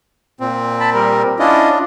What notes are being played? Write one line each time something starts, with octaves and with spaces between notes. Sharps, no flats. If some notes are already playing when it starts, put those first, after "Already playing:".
A#2 C4
A5 B5
G3 A#4
C#4 D4 E4 F4 D#5